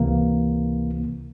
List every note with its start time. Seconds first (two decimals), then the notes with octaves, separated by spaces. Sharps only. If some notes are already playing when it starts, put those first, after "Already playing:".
Already playing: C#2 C3 E3 A#3